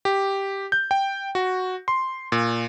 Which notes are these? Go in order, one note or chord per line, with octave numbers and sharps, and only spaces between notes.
G4
G6
G5
F#4
C6
A#2